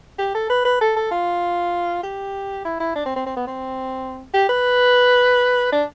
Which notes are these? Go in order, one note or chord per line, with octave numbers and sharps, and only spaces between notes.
G4
A4
B4
B4
A4
A4
F4
G4
E4
E4
D4
C4
C4
C4
B3
C4
G4
B4
D4